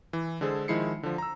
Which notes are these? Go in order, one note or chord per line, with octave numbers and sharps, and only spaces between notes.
E3
D3 G#3 G#4 A4 C5
D#3 F3 G#3 E4 C7 C#7
D3 F3
A#5 E6